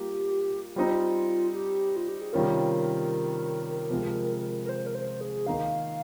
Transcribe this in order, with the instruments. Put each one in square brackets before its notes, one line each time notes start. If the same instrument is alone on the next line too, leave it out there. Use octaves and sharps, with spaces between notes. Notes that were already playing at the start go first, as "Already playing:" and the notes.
Already playing: [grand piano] G3 A#3 F4 [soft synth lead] G4
[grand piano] G3 C4 D#4 [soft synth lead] F4
[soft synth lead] G4
F4
G4
G#4
[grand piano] C3 D#3 G3 C#4 F4 [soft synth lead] A#4
[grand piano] C3 F3 G#3
[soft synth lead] A#4
C5
A#4
C5
G#4
[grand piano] D#3 A#3 D#4 [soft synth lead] F5